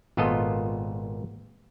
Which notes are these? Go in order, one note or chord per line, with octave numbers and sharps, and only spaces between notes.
G#1 A#2 B3 F4 A4 D#5